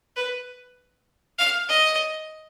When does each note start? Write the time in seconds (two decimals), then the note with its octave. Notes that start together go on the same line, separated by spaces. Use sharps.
0.16 B4
1.38 F5
1.69 D#5